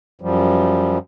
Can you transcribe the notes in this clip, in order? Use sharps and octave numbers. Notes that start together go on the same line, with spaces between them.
F#2 F3 G3